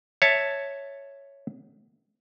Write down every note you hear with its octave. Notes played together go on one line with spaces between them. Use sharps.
C#5 E5 A5